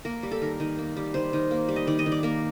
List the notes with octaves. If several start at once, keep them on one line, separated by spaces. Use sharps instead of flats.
A#3 A#4
G3
A4
D#3 A#4
D#3
A#3
G3
D#3 C5
D#3
A#3
G3
D#5
D#3 D5
D#5
D#3
D5
A#3 A#4